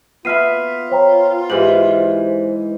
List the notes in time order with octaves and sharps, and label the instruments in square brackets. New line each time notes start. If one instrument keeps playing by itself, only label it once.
[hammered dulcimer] B3 E5 B5 [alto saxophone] F4 [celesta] F6 C7 D#7
[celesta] C5 G5 A#5 [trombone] C#5
[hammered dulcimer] G#2 E3 [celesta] G4 F#7 [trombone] C5